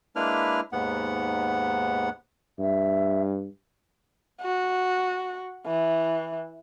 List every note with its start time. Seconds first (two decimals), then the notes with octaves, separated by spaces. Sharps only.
0.16 G#3 A#3 D4 E4 B4 F6
0.72 D#2 G#2 B3 F#5
2.59 G2 E5
4.41 F#4
5.67 E3